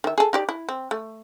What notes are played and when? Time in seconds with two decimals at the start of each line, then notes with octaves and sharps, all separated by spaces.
0.04 D#3 E5
0.18 G#4 A4
0.33 D#4 G4 D5
0.49 E4
0.69 C4
0.91 A3